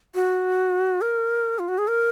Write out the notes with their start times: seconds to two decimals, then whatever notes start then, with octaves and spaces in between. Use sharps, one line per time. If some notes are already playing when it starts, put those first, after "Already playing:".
0.15 F#4
1.01 A#4
1.59 F4
1.68 F#4
1.78 G#4
1.88 A#4